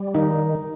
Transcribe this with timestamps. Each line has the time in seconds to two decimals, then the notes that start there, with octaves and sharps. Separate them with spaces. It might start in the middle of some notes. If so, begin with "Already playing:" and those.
Already playing: G3
0.15 D#3 D#4